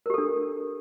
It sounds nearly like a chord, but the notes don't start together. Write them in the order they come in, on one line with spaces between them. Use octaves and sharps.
A#4 G4 A4 D4